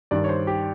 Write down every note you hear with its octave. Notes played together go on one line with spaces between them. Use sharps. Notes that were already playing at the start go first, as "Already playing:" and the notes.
G2 D#3 D5
C#5
C5
G4